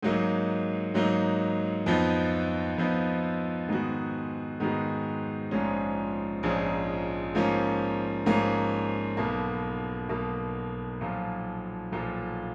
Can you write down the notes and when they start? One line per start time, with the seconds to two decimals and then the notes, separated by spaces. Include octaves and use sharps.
0.02 G#2 F#3 A#3 D#4
0.94 G#2 F#3 A#3 D#4
1.86 F2 F3 B3 D#4
2.77 F2 F3 B3 D#4
3.68 G#2 D#3 G#3 B3 F#4
4.60 G#2 D#3 G#3 B3 F#4
5.51 A#1 G#2 F3 G#3 C#4
6.43 A#1 G#2 F3 G#3 C#4
7.35 G#2 F3 A#3 C#4
8.26 G#2 F3 A#3 C#4
9.17 B1 B2 A#3
10.09 B1 B2 A#3
11.00 B1 A#2 F3
11.92 B1 A#2 F3